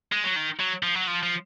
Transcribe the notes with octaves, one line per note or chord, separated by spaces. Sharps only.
G#3
F#3
D#3
F#3
F3
F#3
F3
F3